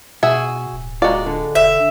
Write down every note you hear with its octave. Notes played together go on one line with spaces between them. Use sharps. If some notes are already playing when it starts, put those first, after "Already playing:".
B2 F#4 G#4 E5
D1
G#3 F4 F#4 D5 A#5
D3
E1 E5